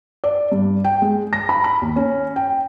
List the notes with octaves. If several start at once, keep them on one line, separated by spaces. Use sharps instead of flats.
D5
G2
G5
G#3
A#6
B5
B5
D#2
C#4
G5